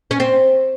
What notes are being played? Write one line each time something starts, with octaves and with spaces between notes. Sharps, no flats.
C#4
C4